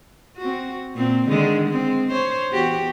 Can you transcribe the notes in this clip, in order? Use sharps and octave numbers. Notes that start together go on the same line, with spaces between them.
C4 F#4
A#2 C4
D3 D#3 G#3
G#3 C4
C5 C#5
E2 F#4 G4